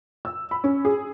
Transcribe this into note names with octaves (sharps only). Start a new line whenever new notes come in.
E6
B5
C#4
G#4